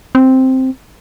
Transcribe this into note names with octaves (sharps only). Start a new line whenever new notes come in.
C4